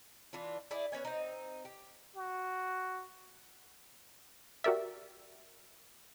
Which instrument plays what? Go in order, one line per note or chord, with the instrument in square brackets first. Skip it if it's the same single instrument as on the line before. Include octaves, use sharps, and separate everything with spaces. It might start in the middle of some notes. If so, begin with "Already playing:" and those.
[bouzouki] E3 D4 F4
E4 G#4 D5 E5
B3 C#4 C#5 G#5
C4 D#4
G4
[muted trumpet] F#4
[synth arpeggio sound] F#4 G4 A#4 D5 E5